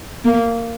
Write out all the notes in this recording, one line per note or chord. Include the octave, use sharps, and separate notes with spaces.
A#3